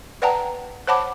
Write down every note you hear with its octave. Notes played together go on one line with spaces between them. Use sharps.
B4 D5 F#5 G5 A5 A#5
C5 C#5 F#5 A5 B5 D6